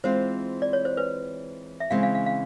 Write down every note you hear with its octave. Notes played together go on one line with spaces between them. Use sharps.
E3 G#3 C4 F4 C5
D5
C#5
C5
B4
E5
C#3 E3 G#3 C4 F5
F5
F5
F5